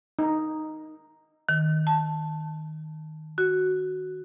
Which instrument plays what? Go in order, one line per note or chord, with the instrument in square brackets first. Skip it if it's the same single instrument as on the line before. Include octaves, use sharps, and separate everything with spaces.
[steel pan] D#4
[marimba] D#3
A5
F#4